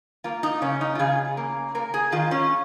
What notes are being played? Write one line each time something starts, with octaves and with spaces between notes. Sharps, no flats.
A#3 F4
D#4
C#3 C#4
D#4
F4
C#3 G#4
A#3
A#3 A#4
G#4
D#3 F4
C#4